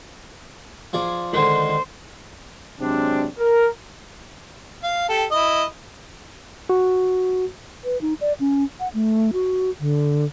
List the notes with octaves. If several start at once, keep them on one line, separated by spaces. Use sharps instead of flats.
F3 G#4 D5
D3 D#3 G#3 C5
C3 F#3 G#3 C4 D4
A#4
F5
G4 A4
E4 D#5
F#4
B4
D#4
D5
C#4
F#5
A3
F#4
D3